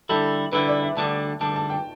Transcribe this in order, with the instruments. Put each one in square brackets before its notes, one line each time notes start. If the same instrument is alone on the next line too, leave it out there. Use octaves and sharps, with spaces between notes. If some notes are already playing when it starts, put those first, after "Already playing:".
[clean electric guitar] D3 G3 E4 [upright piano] A4
[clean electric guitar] D3 G3 E4 [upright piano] B4
[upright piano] D5
E5
[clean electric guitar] D2 D3 G3 D4 [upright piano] A5
[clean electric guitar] D2 D3 G3 D4 [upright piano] A5
[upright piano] A5
G5